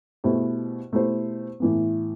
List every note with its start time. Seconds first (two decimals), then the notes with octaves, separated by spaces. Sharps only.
0.24 B2 A3 E4 G4 C5
0.92 B2 A3 E4 G4 C5
1.60 A2 E3 B3